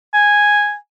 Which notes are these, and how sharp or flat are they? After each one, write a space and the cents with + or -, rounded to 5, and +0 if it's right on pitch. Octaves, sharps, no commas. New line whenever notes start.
G#5 -5